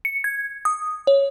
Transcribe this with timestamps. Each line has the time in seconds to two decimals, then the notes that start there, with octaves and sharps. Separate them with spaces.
0.05 C#7
0.24 G#6
0.65 D#6
1.07 C#5